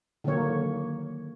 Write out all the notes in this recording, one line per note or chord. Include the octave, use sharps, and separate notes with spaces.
D3 D#3 F#3 A#3 C#5